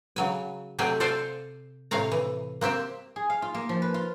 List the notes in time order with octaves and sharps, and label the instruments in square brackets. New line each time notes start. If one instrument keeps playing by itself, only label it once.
[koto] C#3 F#3 G#5
C3 F#3 A3 G4 G#4 G#5
A4 C5 D5 F5 G#5
A2 C3 C#5 F5 A#5
E3
A#3 C4 G4 E5
[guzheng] G#4
F5
F4
A#3
F3
B4
F4